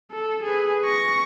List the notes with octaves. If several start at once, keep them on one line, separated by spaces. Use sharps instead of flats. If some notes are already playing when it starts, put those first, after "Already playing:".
A4
G#4 B4
C#6 A#6